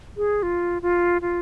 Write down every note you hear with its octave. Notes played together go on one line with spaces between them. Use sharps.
G#4
F4
F4
F4